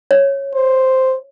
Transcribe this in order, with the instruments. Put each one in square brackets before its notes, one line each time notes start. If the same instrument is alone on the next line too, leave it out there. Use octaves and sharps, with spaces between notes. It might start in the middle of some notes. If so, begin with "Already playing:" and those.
[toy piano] C#5
[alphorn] C5